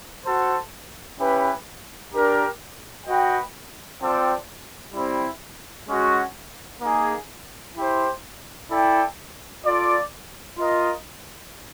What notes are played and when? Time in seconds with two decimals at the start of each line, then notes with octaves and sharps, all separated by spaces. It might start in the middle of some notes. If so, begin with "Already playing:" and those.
0.23 F#4 A4 C5
1.18 C#4 E4 G4 B4
2.12 D4 G4 A#4
3.05 F#4 B4 D#5 G5
4.00 C4 F4 A4 D5 G5
4.94 G3 C4 E4
5.88 G#3 C#4 F#4
6.81 A#3 D#4 G#4
7.76 E4 G4 C5
8.70 E4 A4 D5 G5
9.64 F4 A4 D5
10.58 F4 A#4 D#5